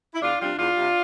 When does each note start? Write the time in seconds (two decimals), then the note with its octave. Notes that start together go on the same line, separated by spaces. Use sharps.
0.15 E4
0.22 E2 D4 F4
0.41 C3 G3 D4 F4
0.58 E2 D4 F4
0.77 C3 G3